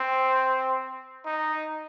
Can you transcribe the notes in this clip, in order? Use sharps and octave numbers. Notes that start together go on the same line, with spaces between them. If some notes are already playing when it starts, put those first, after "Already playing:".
Already playing: C4
D#4